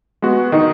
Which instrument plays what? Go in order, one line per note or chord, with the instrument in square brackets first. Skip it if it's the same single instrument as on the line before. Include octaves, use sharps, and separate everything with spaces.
[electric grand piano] G#3 B3 F#4
[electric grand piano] D#3 [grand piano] D#4